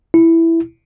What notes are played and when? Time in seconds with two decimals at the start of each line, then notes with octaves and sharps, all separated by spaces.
0.14 E4